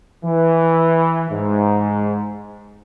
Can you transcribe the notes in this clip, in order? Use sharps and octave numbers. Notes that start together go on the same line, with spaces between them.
E3
G#2